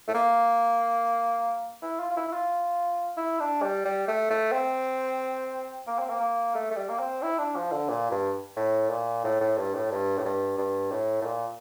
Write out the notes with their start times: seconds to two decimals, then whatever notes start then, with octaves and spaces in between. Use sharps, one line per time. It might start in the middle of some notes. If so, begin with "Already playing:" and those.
0.08 A3
0.15 A#3
1.82 E4
2.00 F4
2.11 F4
2.17 E4
2.27 E4
2.33 F4
3.17 E4
3.40 D4
3.62 G3
3.85 G3
4.08 A3
4.30 A3
4.52 C4
5.87 A#3
5.99 C4
6.10 A#3
6.20 A#3
6.55 A3
6.71 A3
6.76 G3
6.89 A#3
6.99 C4
7.22 E4
7.39 D4
7.56 F3
7.72 D3
7.89 A#2
8.11 G2
8.57 A2
8.90 A#2
9.24 A2
9.41 A2
9.57 G2
9.74 A2
9.91 G2
10.18 A2
10.25 G2
10.58 G2
10.92 A2
11.22 A2
11.26 A#2